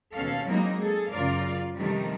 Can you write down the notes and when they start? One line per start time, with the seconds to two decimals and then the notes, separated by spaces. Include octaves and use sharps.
0.14 D#2 B2 C#4 A4 F5
0.46 F#3 G#3 A#3 C4 D#4 E4
0.79 G#4 A4
1.08 F#2 C#3 F4 A#4 D5 F5
1.76 C3 D#3 F3 G3 A3